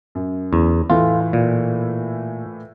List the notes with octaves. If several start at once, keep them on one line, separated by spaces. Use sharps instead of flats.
F#2
E2
A2 E3 A3 F4
A#2